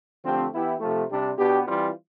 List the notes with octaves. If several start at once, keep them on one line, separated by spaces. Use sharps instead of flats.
D3 F3 A3 C4 G4
E3 B3 E4 G4
C3 F3 A3
C3 G3 D4
B2 B3 D4 G4
E3 G3 C4 F4